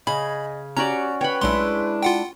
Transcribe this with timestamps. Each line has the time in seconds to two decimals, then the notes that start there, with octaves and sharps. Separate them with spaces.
0.07 C#3 G#4 D#5 B5
0.77 C#4 F#4 G4 D5 A#5
1.21 B4 C#5 G5 B5
1.41 B1 G#3 D4 E4 C6
2.03 F4 F#5 G5